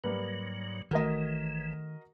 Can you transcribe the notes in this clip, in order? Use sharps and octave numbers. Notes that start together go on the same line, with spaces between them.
G#2 F#3 G3 A#3 B4
A1 D#3 E3 A3 F#4 A#4 D#5